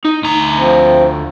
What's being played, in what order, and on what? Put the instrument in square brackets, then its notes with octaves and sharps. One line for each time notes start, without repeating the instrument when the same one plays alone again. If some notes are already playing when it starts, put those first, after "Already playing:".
[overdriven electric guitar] D#4
D2 A#5
[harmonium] F3 C4